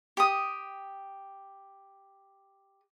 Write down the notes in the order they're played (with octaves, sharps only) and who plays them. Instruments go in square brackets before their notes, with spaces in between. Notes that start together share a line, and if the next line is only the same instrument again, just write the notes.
[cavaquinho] G4 D#6